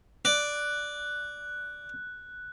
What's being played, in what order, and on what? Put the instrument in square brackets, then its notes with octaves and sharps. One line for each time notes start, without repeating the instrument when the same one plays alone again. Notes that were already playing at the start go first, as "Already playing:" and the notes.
[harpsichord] D5 [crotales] F#6